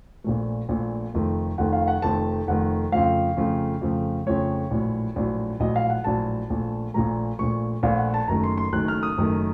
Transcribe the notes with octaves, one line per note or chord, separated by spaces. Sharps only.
A#1 A#2 A3
A#1 A#2 A3
F1 F2 D#3 A3
F1 F2 D#3 A3 F#5
F5
F#5
F1 F2 D#3 A3 A5
F1 F2 D#3 A3 F#5
F2 C#3 F3 A3 F5
F2 C#3 F3 A3
F2 C#3 F3 A3
F2 C#3 F3 A3 C#5
A#1 A2 F#3
A#1 A2 F#3
A#1 A2 F#3 D#5
F5
F#5
A#1 A2 F#3 A5
A#1 A#2 A3
A#1 A#2 A3 A#5
A#1 A#2 A3 C#6
A#1 A#2 A3 F5
F#5
A5
F#1 F#2 D#3 A3 A#5
C6
C6
F#1 F#2 D#3 A3 F#6
F6
D#6
F#1 F#2 D#3 A3